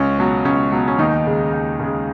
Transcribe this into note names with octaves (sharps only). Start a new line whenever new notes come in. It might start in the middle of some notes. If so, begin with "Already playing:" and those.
Already playing: C#2 C#4
B2 F#3
C#2 C#4
B2 F#3
C#4
D#2 D#3 D#4
C#3 G#3
D#2
C#3 G#3